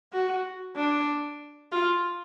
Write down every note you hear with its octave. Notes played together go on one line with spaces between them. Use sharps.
F#4
D4
F4